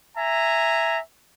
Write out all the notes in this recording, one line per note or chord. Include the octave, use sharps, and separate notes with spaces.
E5 G#5 A#5